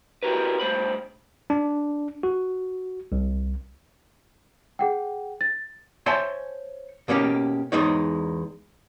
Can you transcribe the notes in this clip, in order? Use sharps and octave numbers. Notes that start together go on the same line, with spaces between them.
E4 F#4 G4 A#4 B4
G2 A3 C5 B5
D4
F#4
C2
G#4 F#5 G5
A6
C5 C#5 E5 G#5 A5 C6
B2 A#3 C#4 G4
E2 G#3 D#4 C#5